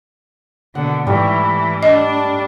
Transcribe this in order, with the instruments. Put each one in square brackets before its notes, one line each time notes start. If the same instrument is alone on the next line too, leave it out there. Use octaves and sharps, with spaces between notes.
[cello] B2 D3 [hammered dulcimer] F#5
[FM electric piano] G#2 [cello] E3 [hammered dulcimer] G3 A3
[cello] D4 [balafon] D#5